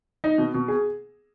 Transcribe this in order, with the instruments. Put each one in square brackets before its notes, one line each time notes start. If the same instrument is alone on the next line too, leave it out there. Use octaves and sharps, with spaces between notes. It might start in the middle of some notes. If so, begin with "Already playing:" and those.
[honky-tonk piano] D#4
B2
B2
G#4